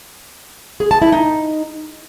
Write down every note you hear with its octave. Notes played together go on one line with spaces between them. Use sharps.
G#4
A5
E4
D#4